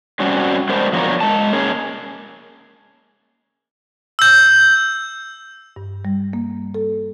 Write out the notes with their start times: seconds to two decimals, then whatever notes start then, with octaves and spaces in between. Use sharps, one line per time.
0.20 F#3 G3 C4 C#4 F#4
0.69 G#3 A3 B3 D4 A#4 C5
0.93 F3 F#3 B3 D4 A#4 C#5
1.21 G#3 A5
1.53 A#3 C#4 G#4
4.19 E6 G6
5.76 G2
6.05 G3
6.33 A#3
6.74 A4